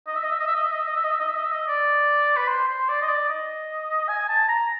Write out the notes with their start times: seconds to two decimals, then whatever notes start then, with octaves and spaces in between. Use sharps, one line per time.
0.07 D#5
0.16 E5
0.23 D#5
0.31 E5
0.39 D#5
0.47 E5
0.55 D#5
0.63 E5
0.71 D#5
0.79 E5
0.87 D#5
0.96 E5
1.04 D#5
1.12 E5
1.20 D#5
1.28 E5
1.36 D#5
1.44 E5
1.51 D#5
1.68 D5
2.37 B4
2.48 C5
2.68 C5
2.88 D5
3.02 D#5
3.08 D5
3.29 D#5
4.08 G#5
4.29 A5
4.48 A#5